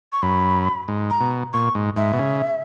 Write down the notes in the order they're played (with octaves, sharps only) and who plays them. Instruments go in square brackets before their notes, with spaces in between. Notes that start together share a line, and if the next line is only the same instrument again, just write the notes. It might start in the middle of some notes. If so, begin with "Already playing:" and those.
[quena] C#6
[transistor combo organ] F#2 [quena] B5
[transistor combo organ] G#2
[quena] A#5
[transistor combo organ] B2
[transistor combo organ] A#2 [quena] C#6
[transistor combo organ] G#2
[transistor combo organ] G#2 [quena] E5
[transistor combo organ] B2
C#3